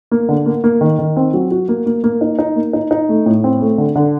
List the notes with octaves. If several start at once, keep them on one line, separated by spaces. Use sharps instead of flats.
A#3
D3
A#3
A#3
D#3
D#3
C4
F#3
F#4
A#3
A#3
A#3
D#4
D#4
A#3
D#4
D#4
A3
A2
C4
A3
D3
D3